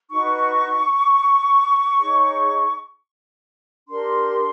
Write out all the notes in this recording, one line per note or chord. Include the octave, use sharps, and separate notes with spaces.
D#4 F#4 B4 C#6
D#4 G#4 C#5
D4 G4 A#4 C6